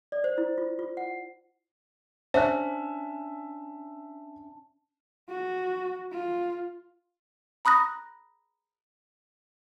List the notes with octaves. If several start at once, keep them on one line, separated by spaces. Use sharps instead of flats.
D5
C5
E4
F4
F4
F#5
C#4 D4 C5 E5 G#5 A5 F#6
F#4
F4
A#5 B5 D#6 F#6 A#6